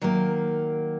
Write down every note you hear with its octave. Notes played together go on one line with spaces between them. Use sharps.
D#3 F#3 A#3